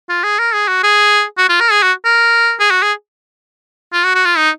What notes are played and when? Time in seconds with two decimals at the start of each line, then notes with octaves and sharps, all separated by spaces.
0.09 F4
0.24 G#4
0.39 A#4
0.54 G#4
0.68 F#4
0.83 G#4
1.38 F#4
1.49 F4
1.61 A#4
1.71 G#4
1.83 F#4
2.05 A#4
2.60 G#4
2.71 F#4
2.82 G#4
3.93 F4
4.04 F#4
4.15 F#4
4.25 F4
4.37 D#4